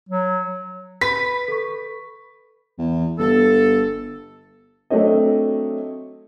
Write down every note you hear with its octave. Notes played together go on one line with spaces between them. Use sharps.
F#3
B4 B6
A4 C#6
E2
G1 A4
F#3 A3 C4 D4 C#5 D#5